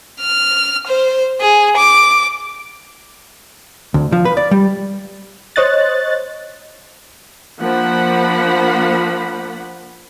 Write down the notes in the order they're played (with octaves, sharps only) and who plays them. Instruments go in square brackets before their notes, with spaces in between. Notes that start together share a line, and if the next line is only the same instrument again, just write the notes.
[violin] F6
C5
G#4
D6
[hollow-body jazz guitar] D2
F3
B4
D5
G3
[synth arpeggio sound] C5 C#5 D#5 F#6 A6
[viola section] F3 A#3 D4 F#5 B5